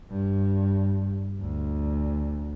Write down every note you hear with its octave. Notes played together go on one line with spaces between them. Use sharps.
G2
D2